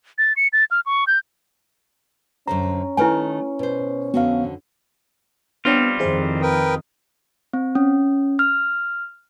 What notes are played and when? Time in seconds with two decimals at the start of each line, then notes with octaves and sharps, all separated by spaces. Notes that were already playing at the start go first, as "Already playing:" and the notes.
0.18 A6
0.36 C#7
0.53 A6
0.71 F6
0.86 C#6
1.07 G6
2.47 F#2 D3 C#4 C5 A#5
2.97 D#3 A3 E4 B4 G#5
3.59 B2 C5
4.14 F2 D3 B3 F#4 F5
5.65 G3 B3 C4 D4 F4 C#5
5.99 F2 D#3 E4 G#4 C5
6.42 A#4 B4 G5 D#6
7.53 C4
7.75 C#4
8.39 F6